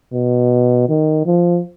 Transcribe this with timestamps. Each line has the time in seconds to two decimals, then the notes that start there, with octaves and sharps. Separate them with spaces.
0.13 B2
0.89 D#3
1.26 F3